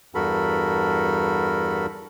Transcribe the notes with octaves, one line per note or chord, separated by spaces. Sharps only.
E2 G2 F#4 A4 A#4 B5